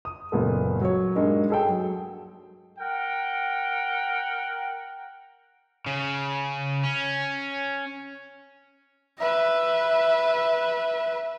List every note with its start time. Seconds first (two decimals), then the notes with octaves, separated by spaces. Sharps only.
0.05 D#6
0.32 F#1 A#2 B3 A4
0.81 F#3 C#5
1.15 G2 G#3 A#3 D#4
1.50 G#4 A4 G5
1.69 F#3
2.79 A#4 F#5 G5
5.86 C#3
6.84 C#4
9.18 B4 E5